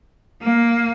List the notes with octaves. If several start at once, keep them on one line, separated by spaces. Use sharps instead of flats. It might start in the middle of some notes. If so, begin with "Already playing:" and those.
A#3